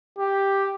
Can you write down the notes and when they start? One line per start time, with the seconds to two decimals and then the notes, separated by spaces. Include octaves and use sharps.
0.18 G4